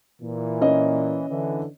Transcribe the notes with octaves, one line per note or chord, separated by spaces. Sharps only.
A#2 E3
C#4 D#5
D3 E3